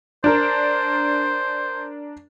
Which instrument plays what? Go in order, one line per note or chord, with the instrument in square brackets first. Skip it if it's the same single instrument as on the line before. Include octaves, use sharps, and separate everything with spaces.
[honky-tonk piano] D4 A#4 [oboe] C5